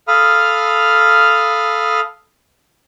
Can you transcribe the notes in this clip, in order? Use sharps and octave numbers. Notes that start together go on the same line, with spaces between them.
A4 F5 B5 D#6 F6